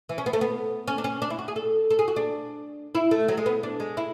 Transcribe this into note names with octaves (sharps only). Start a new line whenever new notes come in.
E3
C#4
B3
A3
B3
C#4
D4
C#4
D4
E4
F#4
G#4
A4
A4
G#4
F#4
D4
E4
A3
F#3
G#3
B3
D4
G#3
E4